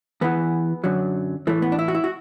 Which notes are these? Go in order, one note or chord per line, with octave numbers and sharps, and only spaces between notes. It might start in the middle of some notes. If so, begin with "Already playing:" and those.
E2 E3 B3
F#2 D3 F#3
A2 E3 A3
B3
D4
E4
F#4
E4
F#4